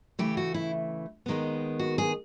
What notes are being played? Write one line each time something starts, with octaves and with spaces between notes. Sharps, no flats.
C#3 E3 A3 G4
F#4
E4
D#2 D#3 G#3 B3
F#4
G#4